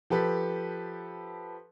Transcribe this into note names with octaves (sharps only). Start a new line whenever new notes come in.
F3 G4 A4 B4